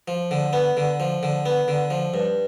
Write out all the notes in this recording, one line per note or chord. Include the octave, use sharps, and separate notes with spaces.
F3
D3
B3
D3
F3
D3
B3
D3
F3
G2